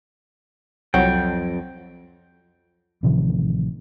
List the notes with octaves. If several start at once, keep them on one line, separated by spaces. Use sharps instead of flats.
C2 F2 F#3 F#5 G5
A1 C3 D#3 F3